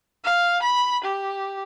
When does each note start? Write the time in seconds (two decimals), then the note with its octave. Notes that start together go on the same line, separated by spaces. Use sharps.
0.24 F5
0.63 B5
1.04 G4